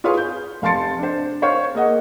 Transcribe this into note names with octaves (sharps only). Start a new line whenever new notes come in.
F4 G#4 B4 C#5 F5
G6
F1 F5 A5 C6 A6 C#7
D4 C5
C5 C#5 F5 C#6
A#3 G#4 D#5 F#5